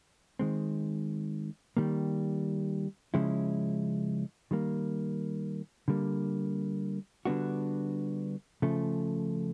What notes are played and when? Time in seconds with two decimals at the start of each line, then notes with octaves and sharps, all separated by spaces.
0.39 D#3 G#3 C4
1.77 D#3 G3 A#3
3.14 C#3 F3 G#3 C#4 E4
4.51 D#3 G3 A#3
5.88 D3 G3 A#3
7.25 D3 G3 B3 D4 F#4
8.62 C#3 F3 A3